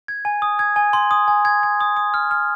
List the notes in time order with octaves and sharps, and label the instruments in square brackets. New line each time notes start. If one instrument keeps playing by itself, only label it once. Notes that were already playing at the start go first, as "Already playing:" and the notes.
[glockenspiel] G#6
G#5
D#6
G#6
G#5
C6
D#6
G#5
G#6
G#6
D#6
D#6
F6
F6